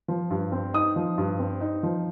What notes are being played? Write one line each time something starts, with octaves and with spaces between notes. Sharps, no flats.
F3
G2
C4
D#4 D#6
F3
G2
C4
D#4
F3